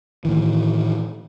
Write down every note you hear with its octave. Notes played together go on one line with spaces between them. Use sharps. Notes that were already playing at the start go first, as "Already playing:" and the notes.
A2 D#3 E3